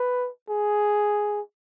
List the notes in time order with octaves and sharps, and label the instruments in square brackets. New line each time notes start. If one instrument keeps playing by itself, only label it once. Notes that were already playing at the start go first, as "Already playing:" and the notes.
Already playing: [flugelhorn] B4
G#4